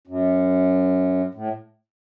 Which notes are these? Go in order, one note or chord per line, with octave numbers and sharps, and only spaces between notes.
F#2
A2